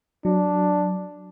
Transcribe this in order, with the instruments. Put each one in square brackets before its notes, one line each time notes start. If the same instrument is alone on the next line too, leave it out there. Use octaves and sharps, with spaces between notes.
[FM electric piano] F#3 [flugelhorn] D4